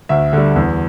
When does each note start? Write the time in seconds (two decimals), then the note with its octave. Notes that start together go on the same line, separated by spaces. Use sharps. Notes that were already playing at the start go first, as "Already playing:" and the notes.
0.09 D2 E5
0.33 D3 G3
0.56 E2